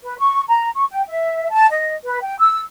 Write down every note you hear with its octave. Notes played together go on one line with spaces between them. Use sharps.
B4
C#6
A#5
C#6
G5
E5
A5
D#5
B4
G5
E6